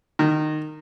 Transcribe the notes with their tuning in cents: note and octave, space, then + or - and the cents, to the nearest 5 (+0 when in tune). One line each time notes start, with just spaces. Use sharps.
D#3 -20